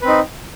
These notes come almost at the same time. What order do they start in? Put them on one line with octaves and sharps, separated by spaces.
B4 C4 D#4